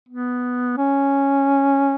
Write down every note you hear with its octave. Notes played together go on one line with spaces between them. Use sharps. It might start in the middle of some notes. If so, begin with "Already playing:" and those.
B3
C#4